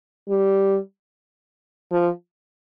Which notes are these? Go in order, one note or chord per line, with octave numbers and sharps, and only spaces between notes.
G3
F3